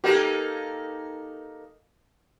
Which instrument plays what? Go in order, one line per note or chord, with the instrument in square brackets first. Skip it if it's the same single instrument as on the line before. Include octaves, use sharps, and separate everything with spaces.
[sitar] A#3 D#4 A4 [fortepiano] G4